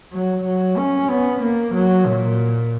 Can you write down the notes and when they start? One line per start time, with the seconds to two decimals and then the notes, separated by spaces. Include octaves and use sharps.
0.13 F#3
0.45 F#3
0.77 C#4
1.09 B3
1.42 A#3
1.75 F#3
2.07 A#2